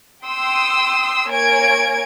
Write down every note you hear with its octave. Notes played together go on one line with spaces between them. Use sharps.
G5 C6 D#6 E6
A#3 C#5 G#5 G#6 D7